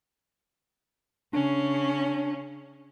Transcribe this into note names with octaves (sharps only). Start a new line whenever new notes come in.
C#3 C#4 D4